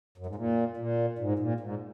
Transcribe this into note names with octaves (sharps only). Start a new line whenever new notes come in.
F#2
G#2
A#2
A#2
G#2
A#2
G#2